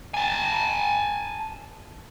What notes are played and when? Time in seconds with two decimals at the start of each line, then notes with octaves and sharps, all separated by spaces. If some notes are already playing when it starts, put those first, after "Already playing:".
0.14 G#5 A5